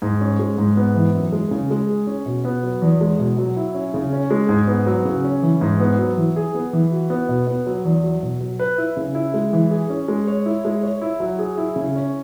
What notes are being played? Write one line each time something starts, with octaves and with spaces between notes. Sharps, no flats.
G#2
C#4
G#3
G#2
B3
E3
F#2
G#3
C#3
G#3
G#4
C#4
B2
B3
F#3
E2
G#3
B2
F#3
E4
C#4
C#3
C#4
G#3
G#2
B3
F#3
C#3
C#4
E3
G#2
B3
F#3
E3
G#4
B3
E3
F#4
B3
B2
B3
F#3
E2
F#3
B2
F#3
B4
E4
C#3
E4
G#3
E3
G#4
C#4
G#3
C#5
E4
G#3
C#5
E4
F#3
G#4
E4
C#3
C#4